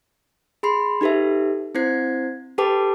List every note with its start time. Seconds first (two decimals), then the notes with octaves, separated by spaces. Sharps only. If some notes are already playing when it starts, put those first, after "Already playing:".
0.63 G#4 B5 C6 C7
1.01 D#4 G4 A4 B4 E5
1.75 C4 E4 C5 G#6 C7
2.58 G4 A4 B4 G5 A5 D6